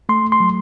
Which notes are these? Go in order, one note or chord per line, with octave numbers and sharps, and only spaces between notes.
A3 C6
C6
F#3